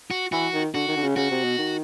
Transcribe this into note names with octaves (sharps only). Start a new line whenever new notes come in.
F#4
E3 F#4
D#3
D3 F#4
D#3
D3
C#3
C#3 F#4
C3
B2
D#3